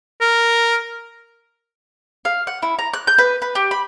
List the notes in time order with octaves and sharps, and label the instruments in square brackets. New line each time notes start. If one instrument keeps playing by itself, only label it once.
[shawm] A#4
[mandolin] F5
F#5
E4
A#5
F#6
G6
B4
B4
G4
B5